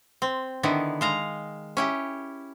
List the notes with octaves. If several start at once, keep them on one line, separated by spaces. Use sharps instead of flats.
C4
D3 D#3 B3 E4
G#3 F5 A#5
C#4 E4 G4